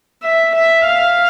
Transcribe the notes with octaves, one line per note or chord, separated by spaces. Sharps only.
E5
E5
F5